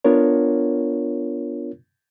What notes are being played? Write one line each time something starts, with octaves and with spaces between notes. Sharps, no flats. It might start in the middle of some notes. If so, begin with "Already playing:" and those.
B3 D4 F4 A#4 C#5